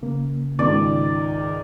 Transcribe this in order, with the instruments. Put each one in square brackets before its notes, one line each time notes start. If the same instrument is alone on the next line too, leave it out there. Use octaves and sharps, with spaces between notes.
[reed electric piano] C#3 A#3
[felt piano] C#2 G#2 [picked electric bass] D#3 [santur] D5